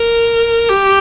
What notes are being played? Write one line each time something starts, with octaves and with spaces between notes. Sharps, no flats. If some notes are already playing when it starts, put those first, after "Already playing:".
Already playing: A#4
G4